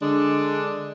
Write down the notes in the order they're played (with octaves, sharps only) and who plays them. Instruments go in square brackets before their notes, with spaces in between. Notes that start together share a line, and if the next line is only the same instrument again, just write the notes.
[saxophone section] D3 G#3 D4